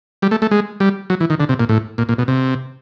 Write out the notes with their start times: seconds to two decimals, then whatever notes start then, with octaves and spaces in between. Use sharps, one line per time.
0.22 G3
0.31 A3
0.42 A3
0.51 G#3
0.80 G3
1.10 F#3
1.20 E3
1.30 D#3
1.40 D3
1.49 C3
1.59 A#2
1.69 A2
1.98 A#2
2.09 A#2
2.18 B2
2.28 C3